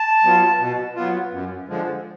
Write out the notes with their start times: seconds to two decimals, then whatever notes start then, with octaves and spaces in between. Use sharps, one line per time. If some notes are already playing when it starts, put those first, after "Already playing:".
Already playing: A5
0.24 F#3 B3 F4
0.59 B2
0.96 F#3 B3 F4
1.32 F#2
1.68 D3 F3 G#3